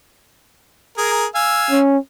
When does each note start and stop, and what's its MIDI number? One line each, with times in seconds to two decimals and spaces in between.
0.98 1.25 68
0.98 1.25 70
1.35 1.79 77
1.35 1.79 80
1.35 1.79 88
1.71 1.98 61